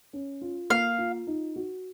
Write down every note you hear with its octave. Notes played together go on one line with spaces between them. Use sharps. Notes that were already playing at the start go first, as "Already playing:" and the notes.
C#4
F4
A#3 F5
F4
D#4
F#4